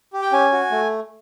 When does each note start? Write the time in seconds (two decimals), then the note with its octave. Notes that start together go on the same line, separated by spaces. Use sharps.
0.13 G4
0.22 G5
0.32 C#4 G#5
0.52 F#4
0.72 A3